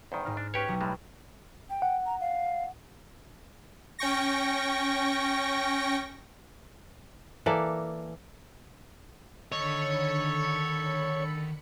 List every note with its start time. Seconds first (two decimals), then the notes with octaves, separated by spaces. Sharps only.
0.12 E2 G2 D#3 C5
0.25 G#2 D#4 F6
0.37 D4
0.54 C#4 G4 B4 C#5 G5 C#6
0.68 B1
0.81 A2 G3 G#3
1.70 G5
1.82 F#5
2.06 A#5
2.21 F5
3.99 C#4 G5 C#6 A#6
7.46 E3 A#3 A4 D5
9.52 D3 D#3 A4 C#5 D#5 B5 C#7